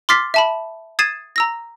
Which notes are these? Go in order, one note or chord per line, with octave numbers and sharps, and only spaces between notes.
C6 D6 F6 A6 B6 C7
E5 A5 B5
D#6 G#6 A6 C7 D#7 E7
A#5 E6 A#6